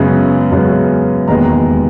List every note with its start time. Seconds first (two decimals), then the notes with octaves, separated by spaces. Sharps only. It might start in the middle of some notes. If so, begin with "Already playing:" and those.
Already playing: F#2 C#3 G#3 B3
0.51 F#2 C#3 G#3 B3
1.28 E1 D#2 D#3 G#3 B3 A#5